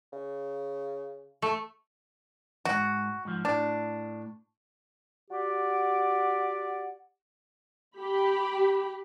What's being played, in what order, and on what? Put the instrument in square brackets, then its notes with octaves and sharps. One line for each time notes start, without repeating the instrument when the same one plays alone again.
[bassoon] C#3
[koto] A3
[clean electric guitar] E2 G#2 [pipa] F#4
[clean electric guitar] G#2 F3
[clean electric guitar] A2 [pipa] D4
[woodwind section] F#4 G4 D5 F#5
[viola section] G4 B5